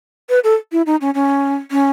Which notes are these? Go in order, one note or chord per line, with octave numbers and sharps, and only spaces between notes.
B4
A4
E4
D#4
C#4
C#4
C#4